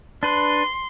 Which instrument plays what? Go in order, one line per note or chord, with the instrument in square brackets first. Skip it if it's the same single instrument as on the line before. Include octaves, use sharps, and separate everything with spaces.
[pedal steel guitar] D4 B4 [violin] C6